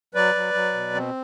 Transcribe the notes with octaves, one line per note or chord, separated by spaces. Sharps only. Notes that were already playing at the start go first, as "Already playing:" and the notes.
F#3 B4 D5
F#3
F#3
B2
C4